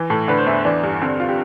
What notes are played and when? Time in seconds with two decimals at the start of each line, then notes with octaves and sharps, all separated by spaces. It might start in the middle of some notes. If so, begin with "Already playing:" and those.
Already playing: E3
0.10 A2 A4
0.28 D3 B4
0.38 C5
0.47 E2 E5
0.64 E3 D4
0.84 G2
1.01 D3 C4
1.20 F4
1.29 G4